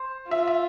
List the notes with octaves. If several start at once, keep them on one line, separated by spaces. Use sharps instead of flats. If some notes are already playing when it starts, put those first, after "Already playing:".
Already playing: C5
F4 E5
E5